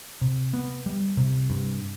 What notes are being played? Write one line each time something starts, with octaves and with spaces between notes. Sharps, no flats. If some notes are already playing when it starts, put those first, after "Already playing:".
C3
B3
G3
C3
G2